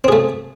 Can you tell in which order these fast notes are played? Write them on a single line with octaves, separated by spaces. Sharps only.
C4 G#4 A3